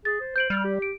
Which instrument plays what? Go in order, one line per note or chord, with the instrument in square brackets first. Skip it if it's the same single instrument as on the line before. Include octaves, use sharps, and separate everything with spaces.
[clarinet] G#4 [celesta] A6
[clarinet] C5
[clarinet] C5 [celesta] G6 D7 F#7
[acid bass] G3 [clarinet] F6
[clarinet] G4
[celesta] D7